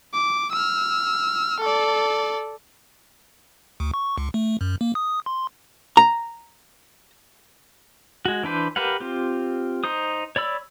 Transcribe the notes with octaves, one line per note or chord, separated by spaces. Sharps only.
D6
E6 F6
A4 D5
D2
C#6
C#2
A3
F#2
A#3
D#6
C6
A#5
G#3 F#4
E3 D4 B4 C5
G4 A#4 B4 F5 F#5
C4 F4 G4
D#4 C5 D#6
C#5 D5 B5 E6